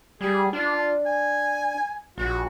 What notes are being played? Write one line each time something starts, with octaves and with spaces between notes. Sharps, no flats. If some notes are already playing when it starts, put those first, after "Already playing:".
G3 G#4
D4 F4
G#5
A#1 F#4